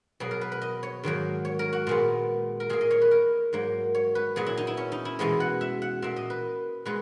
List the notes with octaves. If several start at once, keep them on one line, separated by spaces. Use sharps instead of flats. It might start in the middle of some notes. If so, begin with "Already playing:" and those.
B2 F#3 A#3 G#4
A#4
B4
B4
D#5
C#5
G#2 D#3 F#3 A#3
C#5
A#4
F#4
A#2 G#3 B3
A#4
A#2 A#3 G#4
D#5
C#5
B4
A#4
G#2 F#3 A#3
C#5
B4
A#2 F#3 B3 G#4
E4
D#4
E4
C#4
D#4
E4
E2 B2 G#3 B3 D#5
F#5
E5
F#5
A#2 A#3 E5
D#5
B4
A#2 G#3 B3 B4